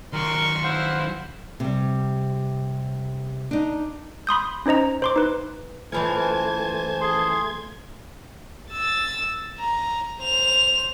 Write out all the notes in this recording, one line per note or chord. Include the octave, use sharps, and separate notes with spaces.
D#3 F#3 A#4 C6 C#6
E4 C5 F5 F#5
C3 G3
D4 D#4
B5 C6 D#6 G6
C#4 D#4 C5 D#5 A#5
C5 C6 D6
D#4 B4
F#2 E3 F3 A3 C5 G#5 A5 G#6
G#4 C6
E6 A6
A#5
C5 F7